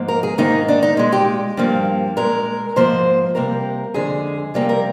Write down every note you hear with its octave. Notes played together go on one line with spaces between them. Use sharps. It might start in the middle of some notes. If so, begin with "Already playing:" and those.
Already playing: G#2 F3 A#3
A#4
G#4
G#2 D#3 A#3 D#4
D4
D#4
A#2 G#3
G4
G2 F3 A#3
A#2 G#3 A#4
G#2 F3 A#3 C5
C3 G3 A#3 A#4
F2 D3 G#3 G#4
F2 C3 G3 A#3 G4
A#4